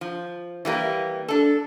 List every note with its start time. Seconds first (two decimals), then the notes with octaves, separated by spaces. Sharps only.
0.01 F3
0.65 E3 G3 A#3
1.28 D4 A4